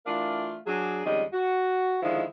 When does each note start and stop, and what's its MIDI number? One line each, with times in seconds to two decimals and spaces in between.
0.06 0.57 52
0.06 0.57 57
0.06 0.57 62
0.06 0.57 65
0.06 0.57 70
0.06 0.57 77
0.67 1.03 54
0.67 1.03 62
0.67 1.03 68
1.05 1.23 41
1.05 1.23 51
1.05 1.23 55
1.05 1.23 56
1.05 1.23 61
1.05 1.23 75
1.33 1.97 66
2.02 2.23 50
2.02 2.23 51
2.02 2.23 53
2.02 2.23 56
2.02 2.23 62
2.02 2.23 64